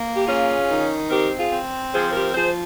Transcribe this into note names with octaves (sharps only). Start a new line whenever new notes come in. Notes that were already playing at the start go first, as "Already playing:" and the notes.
Already playing: A#3
G4
C#4 F4 G#4
D#3
C4 G4 A#4
F4 G#4
C4
F3 G#4 C5
G4 A#4
F3 G#4 C5